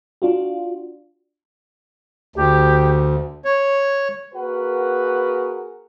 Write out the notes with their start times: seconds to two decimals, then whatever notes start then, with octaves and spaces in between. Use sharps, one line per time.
0.22 D4 F4 F#4
2.36 D2 G4
3.45 C#5
4.34 A#3 F#4 G#4 A#4 B4 F#5